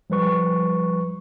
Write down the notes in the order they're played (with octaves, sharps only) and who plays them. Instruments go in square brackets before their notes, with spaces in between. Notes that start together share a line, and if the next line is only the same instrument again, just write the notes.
[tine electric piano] F3 G3 B4 C#6